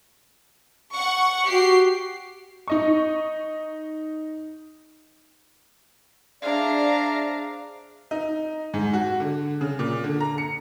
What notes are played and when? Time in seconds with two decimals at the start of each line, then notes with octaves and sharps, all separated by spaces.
0.95 F#5 C#6
1.49 F#4 G4 C7
2.68 D#4 D#5 C#6
6.42 D4 G#4 C5 D5 E5 F5 A#5
8.11 D#4
8.74 G#2
8.93 F#4
9.20 D3
9.61 C#3
9.79 A#2
10.04 D3
10.20 A#5
10.38 C#7